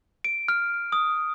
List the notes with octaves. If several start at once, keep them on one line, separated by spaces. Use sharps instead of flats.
D7
F6
D#6